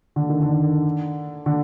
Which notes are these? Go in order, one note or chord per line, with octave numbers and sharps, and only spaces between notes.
D3
D#3
D3
D3